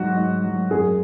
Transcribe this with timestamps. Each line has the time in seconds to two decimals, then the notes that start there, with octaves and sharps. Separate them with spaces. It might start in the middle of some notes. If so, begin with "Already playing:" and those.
Already playing: G#2 F#3 F#4
0.16 G#2
0.44 F#3
0.70 F#2 G#4